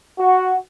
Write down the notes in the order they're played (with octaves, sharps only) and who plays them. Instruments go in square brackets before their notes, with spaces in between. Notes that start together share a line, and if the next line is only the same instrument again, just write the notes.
[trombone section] F#4